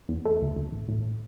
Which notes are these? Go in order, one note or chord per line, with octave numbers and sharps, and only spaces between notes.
E2
A3
D2
D2
A1
A2